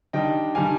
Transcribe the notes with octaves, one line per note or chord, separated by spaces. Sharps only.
D#3 G3 D4 D#5 G5
D#3 G3 D4 F5 G#5